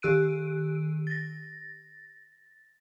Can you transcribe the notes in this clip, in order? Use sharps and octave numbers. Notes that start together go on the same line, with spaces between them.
D#3 G4 E6 F#6 D7 D#7
A6 A#6